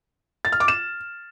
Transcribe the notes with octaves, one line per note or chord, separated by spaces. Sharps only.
A6
F6
D6
E7